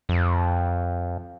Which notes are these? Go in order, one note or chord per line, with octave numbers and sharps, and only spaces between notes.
F2